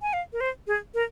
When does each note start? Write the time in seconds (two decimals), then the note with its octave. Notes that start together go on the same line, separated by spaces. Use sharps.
0.02 G#5
0.13 F5
0.33 A#4
0.40 C5
0.67 G#4
0.94 A#4